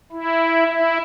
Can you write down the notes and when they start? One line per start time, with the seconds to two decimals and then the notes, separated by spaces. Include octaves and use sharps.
0.12 E4
0.68 E4